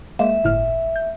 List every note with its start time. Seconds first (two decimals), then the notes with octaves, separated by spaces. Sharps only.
0.19 G#3 A#3 E5
0.44 G1 A2 F6
0.96 G6